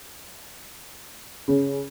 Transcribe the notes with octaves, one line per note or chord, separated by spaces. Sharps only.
C#3